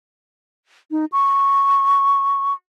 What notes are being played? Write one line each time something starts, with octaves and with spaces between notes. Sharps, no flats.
D#4
C#6